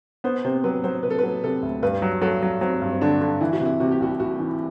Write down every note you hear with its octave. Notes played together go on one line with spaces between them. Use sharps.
B3 C5
C3 C5
F#3 B4
F#3 C5
C3 B4
A4
F#3 B4
C3 A4
D2
G2 B4
F#3
F#3 A4
F#3
F#3 C4
G2
C4
D3 D4
D3
E3 E4
F#4
C3
E4
C3 F#4
G4
C2 F#4
C2 F#4
E3